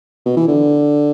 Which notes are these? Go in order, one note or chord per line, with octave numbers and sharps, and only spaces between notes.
B2
E3
D3